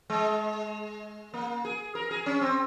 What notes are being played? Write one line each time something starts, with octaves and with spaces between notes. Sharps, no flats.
G#3
A#3
G#4
A#4
G#4
C#4
C4